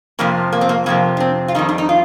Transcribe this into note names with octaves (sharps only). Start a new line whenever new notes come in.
F2 C3 F3 A#3
A#3
C4
A#3
F2 C3 F3 A#3
D4
C4
F4
F2 D#3 G3 D#4
D4
D#4
F4